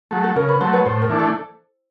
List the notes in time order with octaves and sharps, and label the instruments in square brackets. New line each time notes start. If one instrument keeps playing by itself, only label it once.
[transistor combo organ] F#3 A3 [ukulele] G#4
[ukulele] A4
[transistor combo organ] C#3 [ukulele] A#4
[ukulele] B4
[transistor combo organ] F#3 A3 [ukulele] C5
[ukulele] B4 C#5
[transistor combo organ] A2 [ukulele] C5
[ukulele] A#4
[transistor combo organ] E3 A3 D4
[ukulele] A4